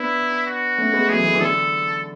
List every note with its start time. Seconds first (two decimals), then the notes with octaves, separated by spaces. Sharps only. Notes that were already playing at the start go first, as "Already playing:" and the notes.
Already playing: B3 D4 E4
0.47 F#4
0.78 A3 C#4
0.93 G#3 B3
1.09 F#3 A3 G#4
1.19 E3 G#3
1.30 D3
1.35 E3
1.40 D3 A4